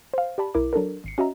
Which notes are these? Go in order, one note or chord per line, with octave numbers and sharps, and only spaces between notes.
C5 F5
G4 D5 A5 B5
B1 E4 A#4 D6
F#3 D4 A4 A#4
G#1 C7 C#7
C#4 F#4 D#5 E5 A#5